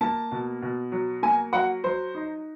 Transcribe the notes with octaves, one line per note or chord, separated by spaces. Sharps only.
A#3 A5
B2
B2
F#3
A#3 G#5
F#3 F#5
F#3 C5
D#4